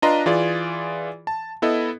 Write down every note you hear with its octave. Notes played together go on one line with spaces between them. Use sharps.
D4 F4 B4 D#5 A#5 C6
E3 F4 G#4 D5
A5
B3 E4 A4 D#5